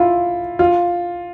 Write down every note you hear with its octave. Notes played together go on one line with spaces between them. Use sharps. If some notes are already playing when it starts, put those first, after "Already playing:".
Already playing: E4 F4
F4